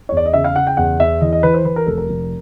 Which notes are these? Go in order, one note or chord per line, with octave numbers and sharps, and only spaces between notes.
E2 C#5
D5
D#5
C#3 E5
F5
C#3 F#5
G5
E2 F#5
E2 E5
E3 D#5
D#5
E3 B4
C5
E3 B4
A#4
F1 A4
A#4
F1